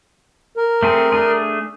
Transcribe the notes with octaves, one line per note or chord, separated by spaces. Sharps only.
A#4
A3 C4 G#4
A3 D4 G#4